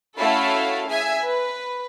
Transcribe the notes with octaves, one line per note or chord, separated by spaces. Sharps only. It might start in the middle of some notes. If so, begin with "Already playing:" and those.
A3 C#4 E4 F#4 A4 F5
G#4 E5 G#5
B4